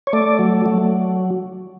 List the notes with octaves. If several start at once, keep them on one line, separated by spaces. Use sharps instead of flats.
C#5
A3 D5
F#3
F#3